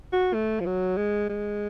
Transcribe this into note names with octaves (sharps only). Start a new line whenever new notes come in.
F#4
A3
F3
F#3
G#3
G#3